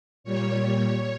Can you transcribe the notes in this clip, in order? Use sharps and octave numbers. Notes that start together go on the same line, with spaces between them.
A#2 G3 C#5